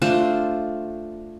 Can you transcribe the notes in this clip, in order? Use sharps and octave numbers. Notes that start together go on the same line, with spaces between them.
A3 D4 F4 C5